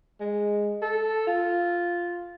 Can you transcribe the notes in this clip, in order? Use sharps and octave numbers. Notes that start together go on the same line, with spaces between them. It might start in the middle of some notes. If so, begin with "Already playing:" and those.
G#3
A4
F4